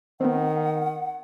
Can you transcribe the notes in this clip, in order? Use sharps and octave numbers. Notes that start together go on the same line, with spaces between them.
D#3 B3 C4 F#5